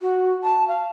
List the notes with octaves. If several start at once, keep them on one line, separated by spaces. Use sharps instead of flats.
F#4
A5
F5